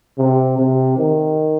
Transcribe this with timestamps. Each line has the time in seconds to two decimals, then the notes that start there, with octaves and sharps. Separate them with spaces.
0.18 C3
0.58 C3
0.97 D#3